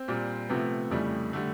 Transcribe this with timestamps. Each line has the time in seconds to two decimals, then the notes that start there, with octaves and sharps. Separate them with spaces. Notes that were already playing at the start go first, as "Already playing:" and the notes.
Already playing: C4
0.08 A#2 G3
0.49 C3 F3 A3 B3
0.91 F2 C#3 E3 G3 A3
1.33 D3 G3 A3